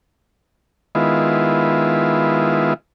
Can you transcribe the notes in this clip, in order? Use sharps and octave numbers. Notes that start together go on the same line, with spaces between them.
D#3 G#3 B3 E4 F4